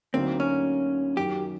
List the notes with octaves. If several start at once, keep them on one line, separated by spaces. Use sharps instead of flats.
D2 D3 F#3 A#3 C4 D#4
C#4
F#2 D#3 F#3 G4